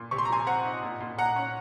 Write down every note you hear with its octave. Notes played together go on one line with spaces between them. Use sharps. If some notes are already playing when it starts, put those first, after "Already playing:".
Already playing: A#2
C3 C#6
C6
A#5
F3 G#5 C6
C4 F#5 A#5
D#4
A#2
A#2
A#2 F#5 A#5
C#4